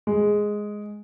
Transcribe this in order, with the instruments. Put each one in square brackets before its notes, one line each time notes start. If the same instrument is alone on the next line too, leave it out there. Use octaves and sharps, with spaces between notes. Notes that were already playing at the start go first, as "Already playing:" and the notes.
[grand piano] G#3